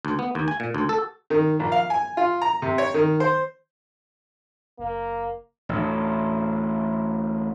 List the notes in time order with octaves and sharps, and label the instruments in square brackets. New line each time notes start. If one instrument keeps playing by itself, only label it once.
[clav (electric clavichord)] D2
B3
D#2
G#5
A#2
D2
A4
[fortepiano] D#3
A#1
F5
G#5
F4
A#5
C3
C#5
D#3
C5
[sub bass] F#1 [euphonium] A#3
[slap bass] A1 D2